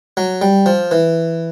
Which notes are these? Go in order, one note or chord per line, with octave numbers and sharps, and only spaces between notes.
F#3
G3
F3
E3